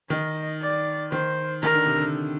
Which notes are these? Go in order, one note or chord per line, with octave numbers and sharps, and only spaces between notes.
D#3 D#5
D5
D#3 C5
D#3 A#4
D3
C3
D3